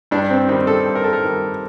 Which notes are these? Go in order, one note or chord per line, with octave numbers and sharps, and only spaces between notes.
G2 D4
C4
D#3 G3 C4
A4
G2
A#4
A4
A#4
D#3 G3